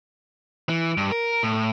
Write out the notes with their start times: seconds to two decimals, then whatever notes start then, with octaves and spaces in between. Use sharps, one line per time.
0.69 E3
0.97 G2
1.12 A#4
1.43 A2